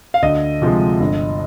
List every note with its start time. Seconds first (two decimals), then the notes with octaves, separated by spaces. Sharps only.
0.14 F5
0.22 D2 D#5
0.62 C3 F3 G#3
1.00 G1